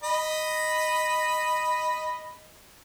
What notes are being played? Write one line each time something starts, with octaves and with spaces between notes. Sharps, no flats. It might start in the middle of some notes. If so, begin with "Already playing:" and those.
D#5 B5